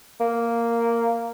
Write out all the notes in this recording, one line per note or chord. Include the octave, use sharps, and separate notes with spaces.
A#3